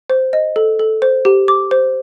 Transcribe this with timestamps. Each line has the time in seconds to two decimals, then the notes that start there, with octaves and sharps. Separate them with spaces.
0.10 C5
0.33 D#5
0.56 A4
0.80 A4
1.02 C5
1.25 G4
1.48 D6
1.71 C5